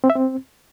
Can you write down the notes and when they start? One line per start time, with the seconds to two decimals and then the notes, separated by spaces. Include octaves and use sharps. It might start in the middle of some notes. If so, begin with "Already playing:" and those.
0.04 C4
0.10 E5
0.16 C4